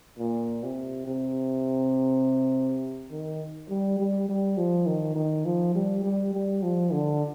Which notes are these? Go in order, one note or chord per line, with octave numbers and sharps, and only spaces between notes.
A#2
C3
C3
D#3
G3
G3
G3
F3
D#3
D#3
F3
G3
G3
G3
F3
D3